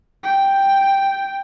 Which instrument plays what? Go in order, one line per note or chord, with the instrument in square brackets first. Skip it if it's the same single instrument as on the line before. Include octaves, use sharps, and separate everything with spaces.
[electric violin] G5